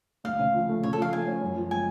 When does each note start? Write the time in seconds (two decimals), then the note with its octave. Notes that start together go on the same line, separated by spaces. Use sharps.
0.24 D2 F5
0.39 C#3
0.54 F3
0.69 A3
0.83 C#3 C#5
0.93 A4
0.98 F3 F5
1.13 A3 G#5
1.27 C#4
1.42 F#2
1.56 F3
1.71 G#3 G#5